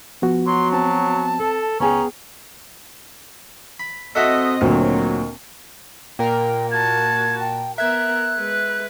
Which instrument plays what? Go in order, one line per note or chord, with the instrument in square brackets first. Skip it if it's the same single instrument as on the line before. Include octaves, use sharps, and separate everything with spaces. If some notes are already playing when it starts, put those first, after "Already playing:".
[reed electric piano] F3 B3 F#4
[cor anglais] F#3 [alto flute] C6
[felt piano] C4 [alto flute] A5
[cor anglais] A4
[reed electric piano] C#2 G#5 [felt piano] B3 G#4 G5 [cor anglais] C#4 [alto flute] A#5
[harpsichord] B5
[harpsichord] A3 F#4 E5 [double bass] C4 [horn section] D#5
[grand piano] D2 A#2 [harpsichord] D#3 [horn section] F#3
[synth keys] A#2 A#4 [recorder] G5
[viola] F#4 A5 [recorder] G#6
[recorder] G5
[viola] B3 A#4 [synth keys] E5 G#6 [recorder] F#6
[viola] G#3 B4